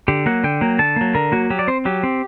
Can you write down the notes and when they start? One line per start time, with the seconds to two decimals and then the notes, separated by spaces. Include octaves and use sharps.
0.08 D3 G4
0.26 F#3 A#3 F#5
0.44 D3 G5
0.61 F#3 A#3
0.79 D3 A5
0.96 F#3 A#3
1.15 D3 A#4
1.32 F#3 A#3 F#4
1.50 F#3 G4
1.59 D5
1.68 C4 C5
1.85 F#3 G4
2.03 C4